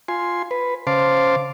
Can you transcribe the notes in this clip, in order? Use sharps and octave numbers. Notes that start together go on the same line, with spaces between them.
F4 G#5 C6
B4
C#3 C5 F5 A5 C6 D6